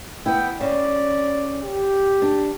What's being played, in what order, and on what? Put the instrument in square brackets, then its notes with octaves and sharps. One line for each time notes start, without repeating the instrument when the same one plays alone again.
[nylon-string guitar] B3 E4 [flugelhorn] G5
[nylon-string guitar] C#3 [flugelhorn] D5
[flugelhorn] G4
[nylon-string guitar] D4